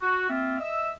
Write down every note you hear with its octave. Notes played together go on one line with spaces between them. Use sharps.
F#4
A#3 C4 F4 E5
D#5 E5 E6